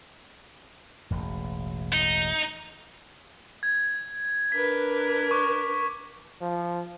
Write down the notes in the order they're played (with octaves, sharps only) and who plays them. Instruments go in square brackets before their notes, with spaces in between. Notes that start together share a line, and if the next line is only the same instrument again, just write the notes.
[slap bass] E1 A1 B2
[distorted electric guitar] D#4
[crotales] G#6
[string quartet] D4 A#4 B4 [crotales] B6
[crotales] C#6 D6
[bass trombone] F3